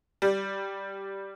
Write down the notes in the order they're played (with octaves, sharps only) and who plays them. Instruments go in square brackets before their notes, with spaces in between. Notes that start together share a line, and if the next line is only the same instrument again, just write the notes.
[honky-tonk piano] G3